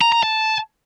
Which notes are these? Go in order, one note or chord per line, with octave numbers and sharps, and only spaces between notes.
A#5
A#5
A5